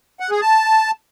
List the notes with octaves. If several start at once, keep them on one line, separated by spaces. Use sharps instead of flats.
F#5
G#4
A5